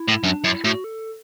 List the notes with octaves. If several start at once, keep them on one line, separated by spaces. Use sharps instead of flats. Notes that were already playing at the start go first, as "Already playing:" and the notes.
Already playing: E4
A2
F#2 D4
D4
F#2 E4
A2 F#4
A4